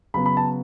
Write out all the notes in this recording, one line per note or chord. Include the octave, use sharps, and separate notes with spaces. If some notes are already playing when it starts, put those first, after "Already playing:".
C#3 F#3 B3 B5
B5
A5